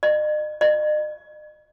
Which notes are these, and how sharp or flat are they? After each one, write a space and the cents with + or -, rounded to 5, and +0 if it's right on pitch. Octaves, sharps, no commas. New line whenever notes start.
D#5 -45
D#5 -45